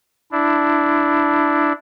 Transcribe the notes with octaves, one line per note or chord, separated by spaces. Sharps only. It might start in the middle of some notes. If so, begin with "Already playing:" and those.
D4 E4